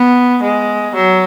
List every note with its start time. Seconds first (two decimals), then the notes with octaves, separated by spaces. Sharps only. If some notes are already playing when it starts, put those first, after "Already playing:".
Already playing: B3
0.43 G#3
0.95 F#3